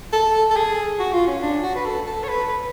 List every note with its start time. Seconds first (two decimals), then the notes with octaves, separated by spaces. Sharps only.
0.13 A4
0.50 A4
0.56 G#4
1.00 F#4
1.13 F4
1.27 C#4
1.43 D4
1.63 F#4
1.76 B4
1.86 A4
2.06 A4
2.24 C#5
2.28 B4
2.49 B4